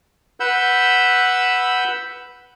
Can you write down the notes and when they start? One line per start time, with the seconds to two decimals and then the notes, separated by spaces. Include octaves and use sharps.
0.40 B4 F#5 B5 E6 G6